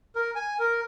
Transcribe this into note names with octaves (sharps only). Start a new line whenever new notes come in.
A#4
G#5
A#4